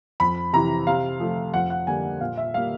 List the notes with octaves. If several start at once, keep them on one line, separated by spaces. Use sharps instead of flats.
F2 B5
C3 E3 A#5
C3 F5
F3 A3
F2 F#5
F#5
D3 G3 A#3 G#5
A#2 F5
E5
G3 A#3 F5